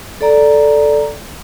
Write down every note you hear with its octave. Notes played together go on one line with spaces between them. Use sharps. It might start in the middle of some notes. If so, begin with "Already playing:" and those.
A4 D5 A#5